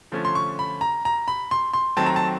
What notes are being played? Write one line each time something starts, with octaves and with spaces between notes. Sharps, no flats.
D3 F3 A3 C#4
C6
C#6
B5
A#5
A#5
B5
C6
C6
D#3 F#3 A3 C4 A5
A#5
A5